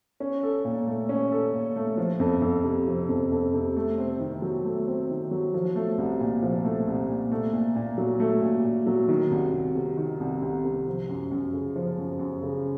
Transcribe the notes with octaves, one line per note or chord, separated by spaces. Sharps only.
C#4
A4
A#2
A3
C#4
A4
A#2
A3
F3
F2
F2
C3
F3
F2
F2
C3
A3
C4
D#3
F#3
A3
C4
D#3
F#3
F3
A3
C2
A#2
F3
A3
C2
A#2
A3
A#2
A#2
F#3
A3
A#2
A#2
F#3
D#3
C2
C2
C3
D#3
C2
C2
C3
F3
F#2
F#2
C#3
F3
F#2
F#2
C#3